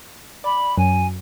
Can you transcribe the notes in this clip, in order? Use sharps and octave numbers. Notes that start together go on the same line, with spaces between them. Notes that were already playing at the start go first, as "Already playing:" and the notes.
D5 B5
F#2 G#5